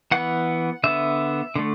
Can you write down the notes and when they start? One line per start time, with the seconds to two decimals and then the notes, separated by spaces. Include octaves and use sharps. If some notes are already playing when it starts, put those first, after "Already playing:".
0.11 E3 B3 F#5
0.84 D3 B3 E5
1.56 D3 A3